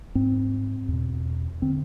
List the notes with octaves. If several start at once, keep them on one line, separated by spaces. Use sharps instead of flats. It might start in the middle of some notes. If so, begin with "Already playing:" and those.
G#2 C4
E2 B2
D3 C4